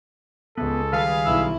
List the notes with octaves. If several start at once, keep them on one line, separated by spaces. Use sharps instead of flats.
C#2 B3 A4
D#3 G3 G#4 B4 F5
B1 E4 E6